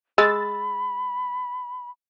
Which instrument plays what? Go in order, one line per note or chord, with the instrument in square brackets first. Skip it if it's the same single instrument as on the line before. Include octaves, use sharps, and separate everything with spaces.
[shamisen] G#3 [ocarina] B5 [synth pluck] E6 A6